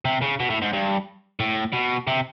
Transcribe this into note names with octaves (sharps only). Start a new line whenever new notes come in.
C3
C#3
B2
A2
G#2
G2
A2
B2
C3